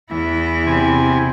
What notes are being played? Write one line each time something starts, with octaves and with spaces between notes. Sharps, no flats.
E2 E3 E4
C3 G#5